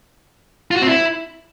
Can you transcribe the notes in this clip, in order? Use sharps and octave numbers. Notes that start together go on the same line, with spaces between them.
F4
F#4
C4
E4